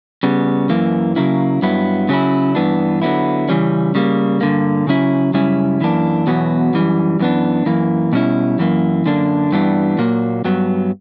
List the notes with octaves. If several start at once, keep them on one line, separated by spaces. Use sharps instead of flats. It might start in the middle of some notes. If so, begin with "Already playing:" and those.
C#3 G3 B3
F#2 E3 A#3
C#3 F#3 A#3 C#4 E4
G2 F#3 B3 E4
C#3 F#3 C#4 E4
G2 E3 B3 D4
D3 F#3 B3 E4
C#3 E3 G3 C#4
C#3 G3 A#3
G2 D3 A#3
C#3 F#3 C#4 E4
F#2 C#3 G3 C#4 E4
F#2 E3 A#3 D4
E2 B2 F#3 B3
F#2 E3 G3
F#2 E3 B3 D4
F#2 E3 A#3
B2 G3 C#4 E4
F#2 E3 A#3
F#2 D3 A#3 D4
G2 E3 G3 B3 D4
A#2 F#3 A#3
G2 F#3 B3